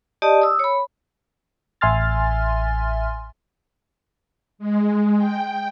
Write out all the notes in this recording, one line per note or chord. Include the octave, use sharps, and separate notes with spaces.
G4 D5 D#5 A5 D#6
D#6 E6
C#5 B5
A1 E5 G#5 C6 F6 A6
G#3
G5